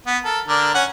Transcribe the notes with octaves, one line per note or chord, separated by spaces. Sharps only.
B3
A4 A#4
D3 D4 A#4
C#4 F#5